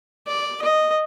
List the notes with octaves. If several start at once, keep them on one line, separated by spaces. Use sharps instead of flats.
D5
D#5